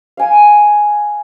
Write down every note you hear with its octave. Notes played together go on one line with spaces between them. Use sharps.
F5 G#5